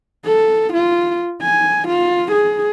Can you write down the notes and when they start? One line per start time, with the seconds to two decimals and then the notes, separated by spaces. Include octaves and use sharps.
0.25 A4
0.73 F4
1.42 G#5
1.88 F4
2.32 G#4